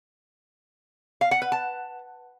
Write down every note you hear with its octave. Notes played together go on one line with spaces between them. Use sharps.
F5
F#5
B4
A5